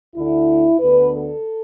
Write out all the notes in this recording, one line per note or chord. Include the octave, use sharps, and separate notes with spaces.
D2 D3 A3 E4
D2 D3 B3 B4
A4